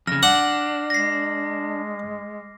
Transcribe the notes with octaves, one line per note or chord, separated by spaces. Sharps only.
F2 C#3 F6 A#6
D4 F#5 D6
G#3 A#6 C7